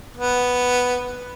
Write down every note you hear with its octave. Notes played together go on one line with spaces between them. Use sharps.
B3